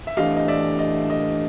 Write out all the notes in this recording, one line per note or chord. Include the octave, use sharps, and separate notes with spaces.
E5
A2 E3 A3 D4 G4 D#5 F5
D#5
D5 E5
D#5
D#5